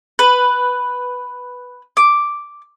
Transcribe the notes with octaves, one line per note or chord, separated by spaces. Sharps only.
B4
D6